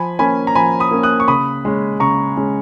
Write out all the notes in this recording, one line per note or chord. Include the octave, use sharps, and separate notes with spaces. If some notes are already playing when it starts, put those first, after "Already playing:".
Already playing: F3 G#5 B5
A#3 C#4 G#5 B5
A#5
F3 G#5 B5
B5 D#6
A#3 C#4
D#6 F#6
C#6
C#3 B5 D#6
G#3 C#4
C#3 A#5 C#6
G#3 C#4